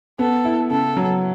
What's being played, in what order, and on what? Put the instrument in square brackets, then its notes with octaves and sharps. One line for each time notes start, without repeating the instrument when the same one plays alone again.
[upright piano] B3 [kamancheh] A4
[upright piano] E4
[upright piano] C#3 [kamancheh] A4
[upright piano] F#3